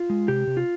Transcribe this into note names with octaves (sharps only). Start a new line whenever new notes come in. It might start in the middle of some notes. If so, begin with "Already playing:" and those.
Already playing: F4
G#3
C3 G4
C3
F4